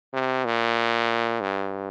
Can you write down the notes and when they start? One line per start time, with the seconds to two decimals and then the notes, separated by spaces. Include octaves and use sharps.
0.13 C3
0.45 A#2
1.41 G2